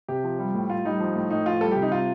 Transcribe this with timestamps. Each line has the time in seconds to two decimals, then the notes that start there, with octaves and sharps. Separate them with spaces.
0.08 C3 G4
0.24 F3
0.39 G3
0.54 A2
0.70 A2 F4
0.85 G3 D#4
1.00 F3
1.15 A2
1.31 A2 D#4
1.46 F3 F4
1.61 G3 A4
1.72 C3 G4
1.82 D#4
1.91 C3 F4